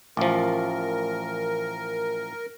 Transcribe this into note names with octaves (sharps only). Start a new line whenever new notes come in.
A1 F3 A#4